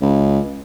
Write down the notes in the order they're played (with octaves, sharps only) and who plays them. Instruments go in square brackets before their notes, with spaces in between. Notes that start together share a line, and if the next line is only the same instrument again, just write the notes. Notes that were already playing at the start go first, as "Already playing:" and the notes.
[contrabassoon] C#2